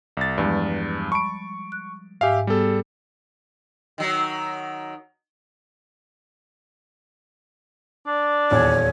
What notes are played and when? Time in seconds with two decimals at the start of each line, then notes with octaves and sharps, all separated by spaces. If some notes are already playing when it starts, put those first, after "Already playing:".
0.17 C2 A6
0.38 E2 G2 F3 G3 G#3
1.12 A5 B5 C#6 D7
1.72 F#6
2.21 G#2 G4 E5 F5 G#5
2.47 G3 B3 G#4 A4
3.98 D#3 F#3
8.07 D4 D5
8.51 D#1 E2 C#5